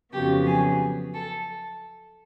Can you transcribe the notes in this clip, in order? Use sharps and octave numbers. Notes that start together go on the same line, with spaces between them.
F2 C#3 F#3 B3 G4
G#4
A4